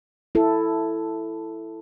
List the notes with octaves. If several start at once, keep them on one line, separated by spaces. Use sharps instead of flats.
E4 A4